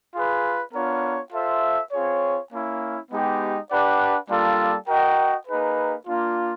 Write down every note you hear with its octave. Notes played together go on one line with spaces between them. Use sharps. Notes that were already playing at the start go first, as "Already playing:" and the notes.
F4 G#4 B4
B3 D4 F4 A#4 C#5
F4 A4 C5 E5
C4 F4 G#4 C#5
A#3 C#4 E4
G#3 B3 D#4 G4
D4 G4 B4 D5 F#5
G3 A#3 D4 F4 A4
F#4 A#4 D#5 G5
A#3 D#4 G#4 B4
A#3 D4 F4